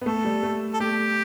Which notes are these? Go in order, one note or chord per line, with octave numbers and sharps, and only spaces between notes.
B3
A3 A4
G3
A3
A4
A3 G4